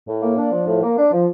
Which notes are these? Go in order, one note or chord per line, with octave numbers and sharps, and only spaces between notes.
A2
A#3
D4
F3
A2
A#3
D4
F3